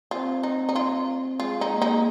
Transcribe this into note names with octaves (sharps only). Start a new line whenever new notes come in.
C4 F4 C5
D#4
D#4
F4
G#3 F4 G#4
D#4
A#3
D#4